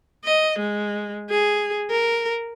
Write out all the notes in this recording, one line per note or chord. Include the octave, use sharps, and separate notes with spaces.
D#5
G#3
G#4
A#4